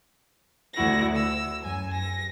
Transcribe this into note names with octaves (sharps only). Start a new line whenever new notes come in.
D2 E4 F#4 A#6
E6
F#2 G#5
A#6